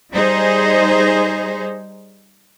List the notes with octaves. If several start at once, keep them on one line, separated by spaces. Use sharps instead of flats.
G3 D#4 G#4 C5